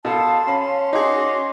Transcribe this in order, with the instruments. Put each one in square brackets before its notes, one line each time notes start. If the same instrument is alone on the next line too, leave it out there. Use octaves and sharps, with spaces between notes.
[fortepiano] B2 A4 [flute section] F5 A5 C6
[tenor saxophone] C#4 [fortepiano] B5
[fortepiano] D#4 G#4 [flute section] F#4 C6 D6